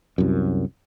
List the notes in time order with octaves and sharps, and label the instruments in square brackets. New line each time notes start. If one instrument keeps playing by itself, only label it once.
[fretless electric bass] C2 F#2